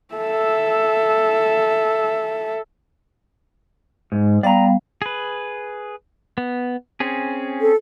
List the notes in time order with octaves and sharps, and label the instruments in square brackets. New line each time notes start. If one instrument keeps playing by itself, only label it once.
[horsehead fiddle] A4 E5
[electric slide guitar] G#2
[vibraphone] G3 B3 F5 [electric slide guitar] D5 A#5
[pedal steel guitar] G#4 B4
B3
C4 C#4 G#4
[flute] A4